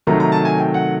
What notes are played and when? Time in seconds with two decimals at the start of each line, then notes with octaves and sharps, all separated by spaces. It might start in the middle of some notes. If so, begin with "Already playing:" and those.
0.07 C3 D#3 F#3 A3 A#5
0.20 A#5
0.32 A5
0.45 G#5
0.58 G5
0.74 F#5